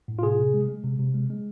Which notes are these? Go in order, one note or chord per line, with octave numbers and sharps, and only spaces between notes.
A2
F4
C3 G#4
C3
G#3
G#3
C3
C3
G#3
G#3